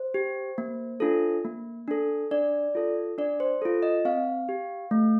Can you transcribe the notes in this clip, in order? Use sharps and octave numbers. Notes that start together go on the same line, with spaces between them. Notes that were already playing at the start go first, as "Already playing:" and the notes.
Already playing: C5
G4
A#3
D4 F4 A4
A#3
D4 A4
D4 D5
F4 A4
D4 D5
C5
F4 A4
D#5
C4 F5
G4
A3